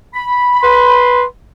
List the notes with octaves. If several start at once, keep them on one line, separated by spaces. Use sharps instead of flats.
B5
B4 C6